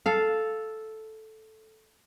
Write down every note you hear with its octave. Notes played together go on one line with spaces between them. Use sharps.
A4 F5